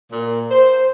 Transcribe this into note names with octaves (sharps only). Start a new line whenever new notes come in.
A#2
C5